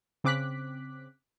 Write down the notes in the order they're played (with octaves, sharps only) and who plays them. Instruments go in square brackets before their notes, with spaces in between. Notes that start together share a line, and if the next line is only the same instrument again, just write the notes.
[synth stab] C#3 C4 D6 F#6 B6